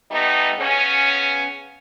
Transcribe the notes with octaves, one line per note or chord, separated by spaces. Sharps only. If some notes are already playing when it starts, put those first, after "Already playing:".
G3 A3 B3 D#4
C#3 B3 C#4